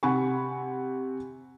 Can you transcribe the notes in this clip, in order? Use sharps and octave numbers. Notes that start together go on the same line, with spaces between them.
C3 F#5 G#5 B5 C#6